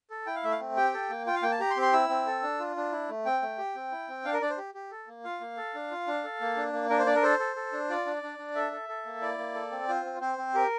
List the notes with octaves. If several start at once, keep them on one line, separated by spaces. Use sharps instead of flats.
A4
E4 G5
F5
A3 E5
F5
C4
G4 G5
A4
A#3
F4 G5
F5
A#3 G5
A5
G4 A#5
C6
C4
C6
E4 E6
C4
A4
D4
F4
D4
E4
A3
C4 G5
A3
G4
C4
E4
C4
D4 F5
A#4
D4 D5
C5
G4
G4
A4
A#3
F4 F5
A#3
A4
D4
F4
D4
A4
A#3
D4
A#3
D4 A#4
C5
D4 D5
A#4
A4 C5
A4
A4
D4
F4 D5
D4
D4
D4
A4 E5
A4
A4
A#3
E4 D5
A#3
A4
C4
F4 C5
C4
C4 C5
C4
G4 A#4